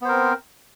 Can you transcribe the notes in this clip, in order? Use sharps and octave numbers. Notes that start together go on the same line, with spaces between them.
B3 C4 A#4 C5